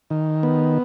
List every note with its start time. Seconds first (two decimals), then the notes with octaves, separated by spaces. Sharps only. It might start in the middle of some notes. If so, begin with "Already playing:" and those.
0.10 D#3
0.43 B3